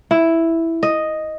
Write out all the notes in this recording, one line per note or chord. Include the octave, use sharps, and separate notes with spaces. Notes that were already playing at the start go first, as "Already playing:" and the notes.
E4
D#5